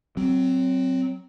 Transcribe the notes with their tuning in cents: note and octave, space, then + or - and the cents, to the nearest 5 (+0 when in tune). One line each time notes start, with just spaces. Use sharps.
F#3 +20 C4 +0